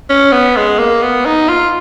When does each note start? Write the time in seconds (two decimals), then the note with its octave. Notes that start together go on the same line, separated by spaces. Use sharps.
0.10 C#4
0.32 B3
0.57 G#3
0.79 A#3
1.02 B3
1.26 D#4
1.49 F4